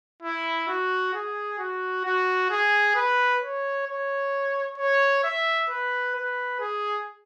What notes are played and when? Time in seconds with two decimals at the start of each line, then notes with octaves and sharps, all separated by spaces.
0.22 E4
0.68 F#4
1.14 G#4
1.59 F#4
2.05 F#4
2.51 G#4
2.95 B4
3.42 C#5
3.86 C#5
4.78 C#5
5.23 E5
5.70 B4
6.15 B4
6.60 G#4